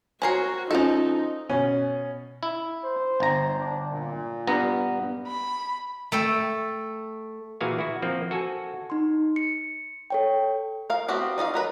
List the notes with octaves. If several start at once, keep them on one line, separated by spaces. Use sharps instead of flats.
C4 F#4 A#4 C#5 G#5 C7
F3 C#4 D#4 F4 A4 D#5
B2 C#4 G#5
E4
C5
G1 A#5
D4
A#2
G2 B3 A#5
B5
A3 A4 G5
A#2 E3 F#4 G#4 F5 G#5
E4 F#4
F3 A#3 C4
F#4 A4 G#5
D#4 C6
C#7
A4 C#5 G5
A#4 F5
A3 B3 C4 F#4 G4
D#4 D5 D#5 F5
F#3 A#4 B4